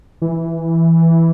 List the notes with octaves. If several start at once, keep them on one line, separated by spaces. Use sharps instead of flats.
E3